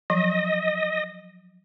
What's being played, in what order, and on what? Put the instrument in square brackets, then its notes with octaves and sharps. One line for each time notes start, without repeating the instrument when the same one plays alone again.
[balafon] F3 F#3 [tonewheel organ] D#5